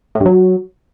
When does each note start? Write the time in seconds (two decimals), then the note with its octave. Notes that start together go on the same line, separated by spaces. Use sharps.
0.15 A2
0.20 G2
0.26 F#3